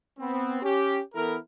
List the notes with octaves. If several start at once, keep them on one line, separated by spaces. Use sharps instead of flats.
B3 C4
C#4 G4
E3 B3 E4 A4 A#4